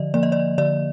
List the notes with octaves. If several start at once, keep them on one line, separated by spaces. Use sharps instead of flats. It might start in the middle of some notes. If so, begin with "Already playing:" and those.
Already playing: D3 F3 D5 D#5
F3 A#3 D5
D#5
D5
D3 D5